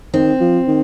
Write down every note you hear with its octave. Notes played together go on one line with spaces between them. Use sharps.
D#3 C4
F3
D#3